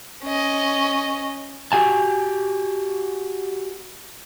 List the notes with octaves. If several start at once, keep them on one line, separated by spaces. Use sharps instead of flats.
C#4 D#5
F#4 G4 G#5 A5